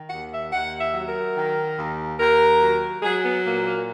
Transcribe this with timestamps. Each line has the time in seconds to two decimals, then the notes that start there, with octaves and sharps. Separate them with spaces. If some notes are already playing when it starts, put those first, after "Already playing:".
Already playing: D#3
0.10 D#2 F#5
0.31 E5
0.52 D#2 F#5
0.79 E5
0.94 F#3
1.08 A#4
1.35 D#3
1.77 D#2
2.19 D#2 A#4
2.61 F#3
3.02 F#3 G#4
3.23 B3
3.44 A#2 A#3
3.66 A#3